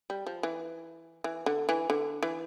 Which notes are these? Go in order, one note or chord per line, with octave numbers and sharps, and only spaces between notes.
G3
F3
E3
E3
D3
E3
D3
E3